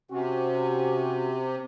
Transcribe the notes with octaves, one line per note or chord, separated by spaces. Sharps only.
C3 C#4 F#4